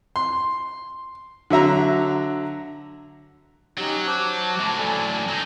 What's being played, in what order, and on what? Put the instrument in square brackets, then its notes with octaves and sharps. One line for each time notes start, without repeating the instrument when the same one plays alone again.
[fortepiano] C6
D3 F#3 E5 A#5
[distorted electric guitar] F#3 [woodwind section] C#4 D#4 [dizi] G4
[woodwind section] C5 D6 [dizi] A5
[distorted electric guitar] F#2 A2
[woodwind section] A4 D5 G#5
[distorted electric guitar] F#3 D#4